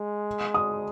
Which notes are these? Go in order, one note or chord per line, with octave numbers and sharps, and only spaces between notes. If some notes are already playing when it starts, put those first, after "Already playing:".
Already playing: G#3
D#6